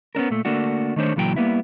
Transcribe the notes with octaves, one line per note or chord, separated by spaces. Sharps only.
B3 C#4 D4 A#4
A#2 A3
D3 A3 A#3 D4 F#4
D#3 A3 D4 C5 C#5
C#2 A#2 E3 F#3 F#4 G5
G3 A#3 B3 E4